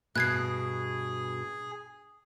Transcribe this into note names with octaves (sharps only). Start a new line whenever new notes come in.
G2 B2 G#4 F#6 G#6 C7